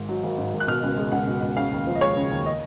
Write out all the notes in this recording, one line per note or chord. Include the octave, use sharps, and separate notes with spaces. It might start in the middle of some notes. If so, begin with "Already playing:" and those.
Already playing: G#1 G#2
F#3
G#1
G#2
G#1
F#6
B2 F6
C#2
G#3
C#2 F#5
B2
C#2
C#3 F5
D#2
F3
D#5
G#3 C#5
C#3
D#2
D#5